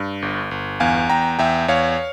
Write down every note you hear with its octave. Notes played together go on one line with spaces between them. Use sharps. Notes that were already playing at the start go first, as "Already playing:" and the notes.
Already playing: G2
G1
G1
E2 F5 G#5
E2 G5 A#5
E2 E5 G5
E2 C#5 F5